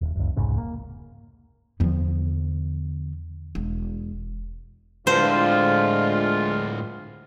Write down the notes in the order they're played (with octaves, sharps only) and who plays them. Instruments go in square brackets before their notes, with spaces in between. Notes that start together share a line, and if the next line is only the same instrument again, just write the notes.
[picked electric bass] D#1
F#1 C#2
E1 C2 G#2 C#3
A#3
[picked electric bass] E2 F3 [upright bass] D3 B3
[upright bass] E1
[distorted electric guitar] A2 D3 [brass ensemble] G#3 D4 F4 [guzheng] C5